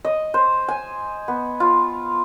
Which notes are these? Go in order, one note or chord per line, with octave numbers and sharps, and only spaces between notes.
D#5
C5
G#5
B3
F4